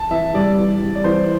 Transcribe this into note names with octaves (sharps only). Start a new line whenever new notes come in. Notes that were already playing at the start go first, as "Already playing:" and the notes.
Already playing: A5
E3 E5
G3 D5
E3
G3
D5
E3 C5